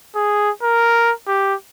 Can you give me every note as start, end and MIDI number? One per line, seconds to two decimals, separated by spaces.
0.15 0.50 68
0.63 1.12 70
1.27 1.54 67